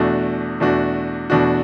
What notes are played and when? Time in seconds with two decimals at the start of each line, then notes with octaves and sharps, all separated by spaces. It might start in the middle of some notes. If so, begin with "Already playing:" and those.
Already playing: E2 B2 A3 D4 F#4
0.60 E2 B2 A3 D4 F#4
1.30 E2 B2 A3 D4 F#4